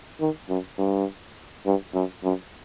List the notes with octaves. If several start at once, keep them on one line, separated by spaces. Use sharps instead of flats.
D#3
F#2
G2
G2
F#2
F#2